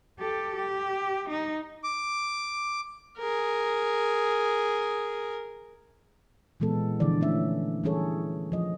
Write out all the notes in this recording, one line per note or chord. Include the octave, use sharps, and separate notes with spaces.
G4 A4
G4
D#4
D6
G#4 A#4
A#2 E3 G#3 B3 A4
D3 E3 F3 D5
A3 C#4 E5
E3 G3 C#4 G#4 A4 C#5
F3 D#5